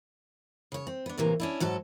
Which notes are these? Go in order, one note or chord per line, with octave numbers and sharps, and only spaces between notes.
C#3 C#5
C4
B3 D4
A2 C3 E3 A#3
C#4 D4 E4
G#2 F#3 F#4 A4